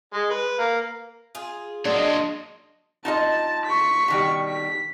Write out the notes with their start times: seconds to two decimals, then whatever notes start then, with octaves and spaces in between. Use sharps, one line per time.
0.13 G#3
0.30 B4
0.59 A#3
1.35 F4 G#4
1.85 F#3 A#3 D4 D#5 C6
3.05 D#4 F4 D#5 A5
3.66 C#6 B6
4.08 B2 D#3 G3
4.48 B6